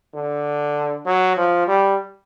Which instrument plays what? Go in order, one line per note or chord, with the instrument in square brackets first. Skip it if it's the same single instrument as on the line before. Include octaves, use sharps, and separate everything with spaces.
[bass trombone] D3
F#3
F3
G3